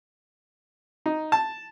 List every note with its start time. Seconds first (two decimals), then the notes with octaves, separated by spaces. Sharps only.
1.06 D#4
1.32 A5